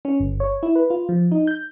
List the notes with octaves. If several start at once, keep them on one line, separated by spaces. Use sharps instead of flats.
C#4
G1
C#5
E4
B4
F4
F3
D#4
G6